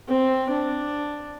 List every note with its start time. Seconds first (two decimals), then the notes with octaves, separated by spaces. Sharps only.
0.09 C4
0.50 D4